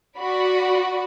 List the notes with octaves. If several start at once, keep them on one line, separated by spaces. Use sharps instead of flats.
F#4 D5 B5